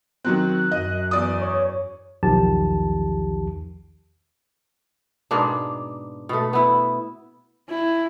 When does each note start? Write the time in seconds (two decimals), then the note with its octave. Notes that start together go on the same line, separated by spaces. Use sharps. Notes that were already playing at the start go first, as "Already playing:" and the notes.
0.24 D#3 F#3 C4 F#6
0.71 F#2 D#5
1.11 E2 D5 D#6
1.41 C#5
2.23 B1 E2 D#3 F3 G4 A5
5.31 G#2 B2 A#3 D4
6.29 B2 A3
6.53 B3 E4
7.68 E4